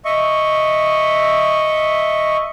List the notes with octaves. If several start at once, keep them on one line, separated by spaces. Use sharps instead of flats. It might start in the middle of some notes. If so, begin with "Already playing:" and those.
D#5 E5 C#6